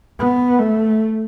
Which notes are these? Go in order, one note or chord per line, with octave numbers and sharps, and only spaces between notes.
B3
A3